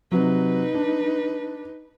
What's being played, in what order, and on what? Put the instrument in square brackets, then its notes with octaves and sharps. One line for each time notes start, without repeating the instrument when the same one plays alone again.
[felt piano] C3 F#3 [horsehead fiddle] D#4 B4
[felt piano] D4